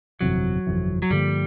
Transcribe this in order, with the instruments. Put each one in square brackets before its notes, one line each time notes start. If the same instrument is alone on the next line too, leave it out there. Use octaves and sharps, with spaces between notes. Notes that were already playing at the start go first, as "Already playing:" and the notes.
[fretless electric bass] G1 F2 C3 E3 [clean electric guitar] F#3
[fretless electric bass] G1 F2 C3 E3
[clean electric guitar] F#3
[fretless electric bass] G2 D3 F3 A#3 [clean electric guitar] G3